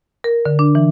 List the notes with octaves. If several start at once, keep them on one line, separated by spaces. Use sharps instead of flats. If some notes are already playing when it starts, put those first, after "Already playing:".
A#4
D3
D4
E3